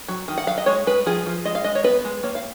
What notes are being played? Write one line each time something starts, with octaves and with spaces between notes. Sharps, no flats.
F#3
D#3
F#5
F#3 F5
D#5
G#3 C#5
G#3 B4
F3 G#4
F3
G#3 D#5
F5
G#3 D#5
C#5
B3 B4
G#3
A#3 C#5
F5